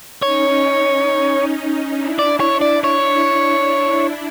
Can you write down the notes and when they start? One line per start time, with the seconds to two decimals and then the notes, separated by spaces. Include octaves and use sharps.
0.22 C#4 D#4 C#5
1.97 D4 E4
2.19 D5
2.40 C#5
2.61 D5
2.84 C#5